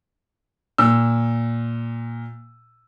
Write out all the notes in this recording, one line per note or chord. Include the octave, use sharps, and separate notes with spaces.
A#2 E6